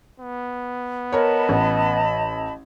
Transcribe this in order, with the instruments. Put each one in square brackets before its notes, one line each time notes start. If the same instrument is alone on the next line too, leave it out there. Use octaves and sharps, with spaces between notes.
[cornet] B3
[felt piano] A#4 C#5 [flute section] D#5 A5 B5
[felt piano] A1